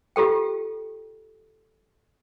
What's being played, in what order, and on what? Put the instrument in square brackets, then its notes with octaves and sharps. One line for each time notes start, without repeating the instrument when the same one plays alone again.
[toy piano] F4 G4 A4 G5